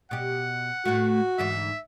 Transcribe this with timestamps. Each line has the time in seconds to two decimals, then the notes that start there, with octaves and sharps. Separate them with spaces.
0.11 B2 G4 F#5
0.85 A2 A3 F#4
1.38 D2 G#2 E3 E5